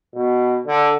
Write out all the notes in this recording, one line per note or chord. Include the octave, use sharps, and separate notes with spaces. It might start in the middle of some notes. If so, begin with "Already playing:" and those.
B2
D3